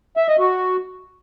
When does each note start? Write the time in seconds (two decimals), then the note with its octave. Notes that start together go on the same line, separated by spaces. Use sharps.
0.17 E5
0.28 D#5
0.39 F#4